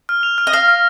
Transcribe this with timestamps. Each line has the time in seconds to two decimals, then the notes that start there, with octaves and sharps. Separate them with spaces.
0.09 F6
0.23 F7
0.38 F6
0.47 D#5
0.53 F5 A#6
0.68 F6